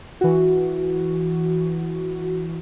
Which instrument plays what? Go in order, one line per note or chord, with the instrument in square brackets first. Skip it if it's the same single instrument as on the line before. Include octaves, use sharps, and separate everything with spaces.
[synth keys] E3 F#4